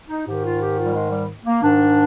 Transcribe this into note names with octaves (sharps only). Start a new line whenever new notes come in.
D#4
G#2 D#3 G4
F4
G4
F4
G3
G#3
G3
A#3
G#2 D#3 D4